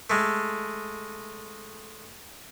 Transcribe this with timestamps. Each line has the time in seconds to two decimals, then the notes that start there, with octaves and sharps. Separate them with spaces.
0.10 G#3 A3